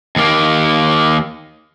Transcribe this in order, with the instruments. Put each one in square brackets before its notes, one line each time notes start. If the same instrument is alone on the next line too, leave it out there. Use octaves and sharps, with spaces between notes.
[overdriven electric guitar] D#2 A#3